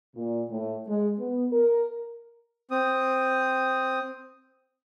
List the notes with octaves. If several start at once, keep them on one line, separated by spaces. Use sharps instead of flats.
A#2
A2
G#3
B3
A#4
C4 D#6